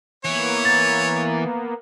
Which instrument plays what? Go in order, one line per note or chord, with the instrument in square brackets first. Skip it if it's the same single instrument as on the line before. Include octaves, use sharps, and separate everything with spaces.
[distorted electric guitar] E3 [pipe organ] A#3 B3 [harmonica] C#5
[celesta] A6